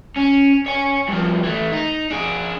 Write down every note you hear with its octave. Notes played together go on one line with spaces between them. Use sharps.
C#4
C#5 G#5
G2 F3
E3 A3
D#4
D4 G#4